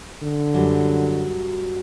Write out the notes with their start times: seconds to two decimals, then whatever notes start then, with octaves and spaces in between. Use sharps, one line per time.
0.23 D3
0.54 F#2 F#3 G3